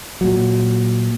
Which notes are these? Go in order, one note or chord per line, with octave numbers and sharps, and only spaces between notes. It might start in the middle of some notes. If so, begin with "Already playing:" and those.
A#2 F#3